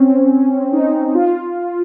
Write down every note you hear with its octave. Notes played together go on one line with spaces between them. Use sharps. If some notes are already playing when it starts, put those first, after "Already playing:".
Already playing: C4 C#4
C#4
D#4
F4